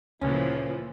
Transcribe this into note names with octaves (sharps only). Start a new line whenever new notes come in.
D2 A#2 C#3 E3 F3 A#3 C#4